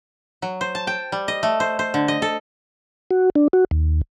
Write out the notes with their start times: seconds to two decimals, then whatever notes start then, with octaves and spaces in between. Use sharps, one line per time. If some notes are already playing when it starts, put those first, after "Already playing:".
0.42 F#3
0.61 C5
0.75 A5
0.87 G5
1.12 G3
1.28 D#5
1.43 A3
1.60 C5
1.79 C5
1.94 D3
2.08 D#5
2.22 A4
3.11 F#4
3.35 D4
3.53 F#4
3.71 D#2